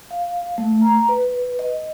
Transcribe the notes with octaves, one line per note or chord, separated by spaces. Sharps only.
F5
A3
A#5
B4
D#5